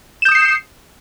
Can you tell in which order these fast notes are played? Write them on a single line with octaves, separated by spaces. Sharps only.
E7 G6 D#6 C#7 C7